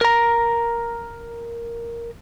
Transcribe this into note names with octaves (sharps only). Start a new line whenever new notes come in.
A#4 A#5